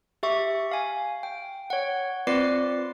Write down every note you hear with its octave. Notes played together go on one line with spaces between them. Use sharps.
G4 E5 C#6
F5 G#5
G5
C#5 F#5
C4 F4 B4 D5 D6 C7